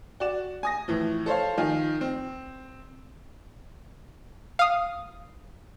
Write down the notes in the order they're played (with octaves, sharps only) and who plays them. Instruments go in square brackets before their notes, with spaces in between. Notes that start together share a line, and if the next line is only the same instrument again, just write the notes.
[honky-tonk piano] F#4 D5 E7
G#5 D#6 A#6
A2 E3 F3
A4 C5 C#5 F5
D#3 F3 F5 G#5
C4
[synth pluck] F5 D#6